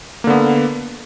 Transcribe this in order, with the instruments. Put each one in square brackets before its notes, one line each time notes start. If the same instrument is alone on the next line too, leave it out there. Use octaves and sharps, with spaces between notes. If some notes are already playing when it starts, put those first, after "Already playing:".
[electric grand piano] A#3
D3
B3